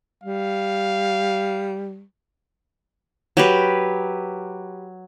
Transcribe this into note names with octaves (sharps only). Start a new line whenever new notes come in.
G3 F5
F#3 G4 B4